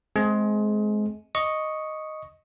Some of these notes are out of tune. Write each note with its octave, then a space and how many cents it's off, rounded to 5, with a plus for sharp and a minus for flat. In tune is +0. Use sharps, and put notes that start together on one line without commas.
G#3 +25 C4 +0 G#4 +30
D#5 +0 C#6 +0